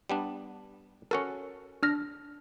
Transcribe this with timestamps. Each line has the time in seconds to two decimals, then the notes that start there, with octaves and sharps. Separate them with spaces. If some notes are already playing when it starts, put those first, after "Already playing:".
0.10 G3 B3 D4
1.11 C#4 F#4 A4 A#4 C#7
1.83 D4 F6 A#6